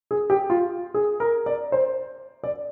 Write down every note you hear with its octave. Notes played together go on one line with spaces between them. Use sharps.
G#4
G4
F4
G#4
A#4
D5
C5
D5